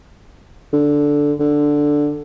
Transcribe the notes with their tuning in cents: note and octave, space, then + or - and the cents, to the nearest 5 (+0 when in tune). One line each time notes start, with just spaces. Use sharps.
D3 -5
D3 +0